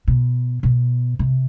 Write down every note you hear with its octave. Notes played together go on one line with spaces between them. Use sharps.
B2
B2
C3